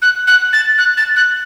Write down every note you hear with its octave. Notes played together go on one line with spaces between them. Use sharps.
F#6
F#6
A6
F#6
A6
F#6